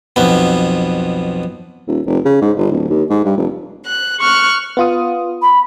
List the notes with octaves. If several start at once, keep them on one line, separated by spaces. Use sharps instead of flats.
B1 F2 B3
D#1
F1
C#3
G#2
G1
D1
D#2
G#2
G2
F1
F#6
C#6 F6 F#6
B3 F4 D#6
B5